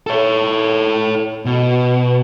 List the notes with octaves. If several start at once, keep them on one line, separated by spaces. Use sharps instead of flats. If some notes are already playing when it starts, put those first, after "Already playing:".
A4 C#5
B2